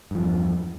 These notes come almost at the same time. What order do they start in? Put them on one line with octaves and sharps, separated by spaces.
G2 F3 E2